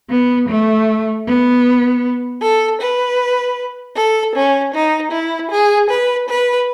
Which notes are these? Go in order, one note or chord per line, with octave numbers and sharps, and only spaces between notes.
B3
A3
B3
A4
B4
A4
C#4
D#4
E4
G#4
B4
B4